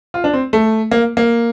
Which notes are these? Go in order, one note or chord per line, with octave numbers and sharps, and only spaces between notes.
F4
D4
C4
A3
A#3
A#3